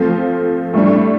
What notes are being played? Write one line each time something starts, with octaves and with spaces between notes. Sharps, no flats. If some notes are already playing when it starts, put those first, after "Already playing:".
Already playing: F3 A3 C4 F4
A2 G3 D4